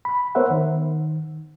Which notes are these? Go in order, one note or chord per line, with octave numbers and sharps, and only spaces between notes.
B5
B3 A#4 C5 C#5 E5 F#5
D#3